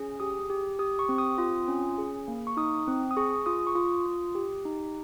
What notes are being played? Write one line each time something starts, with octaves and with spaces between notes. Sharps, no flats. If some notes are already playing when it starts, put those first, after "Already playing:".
Already playing: C#4 G#4
G4 D#6
G4
G4 D#6
C#6
C4
D#6
F4
C#4
G#4
A#3
C#6
D#4 D#6
C4
D#6
G#4 C#6
F4 D#6
C#6
F4 D#6
F4
G4
D#4